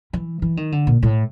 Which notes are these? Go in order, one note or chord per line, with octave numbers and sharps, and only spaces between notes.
E3
E3
D#3
D3
A#2
A2